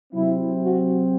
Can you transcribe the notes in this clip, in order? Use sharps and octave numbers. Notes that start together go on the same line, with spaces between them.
C3 F#3 C4 E4
F#4